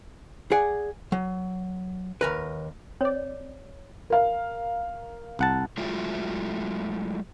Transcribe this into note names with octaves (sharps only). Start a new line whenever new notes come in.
G#4 D5 F#5
F#3
D#2 A#4 B4
C4 C#5 D5
A#4 F5
C2 F#5 A5
F#3 G#3 A3 E4 F4